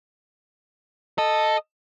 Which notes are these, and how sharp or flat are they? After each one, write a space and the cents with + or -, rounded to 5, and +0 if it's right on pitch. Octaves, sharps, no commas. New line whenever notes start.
A4 +0 D#5 -5